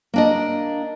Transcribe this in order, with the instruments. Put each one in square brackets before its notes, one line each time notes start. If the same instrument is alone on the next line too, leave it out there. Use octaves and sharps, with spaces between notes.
[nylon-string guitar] A#3 D4 D#5